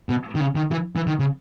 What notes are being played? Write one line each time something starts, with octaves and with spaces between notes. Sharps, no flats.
B2
D#3
C#3
D#3
E3
E3
D#3
C#3